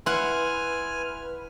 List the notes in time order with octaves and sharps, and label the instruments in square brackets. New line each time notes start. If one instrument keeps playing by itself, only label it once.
[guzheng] E4 F#5 [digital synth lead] B4 [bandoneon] G#5 F6 [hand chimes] C6